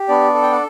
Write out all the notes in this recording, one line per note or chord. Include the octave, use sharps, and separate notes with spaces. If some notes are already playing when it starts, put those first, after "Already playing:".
Already playing: G4
B3 D4 D5
A4
G5
F#5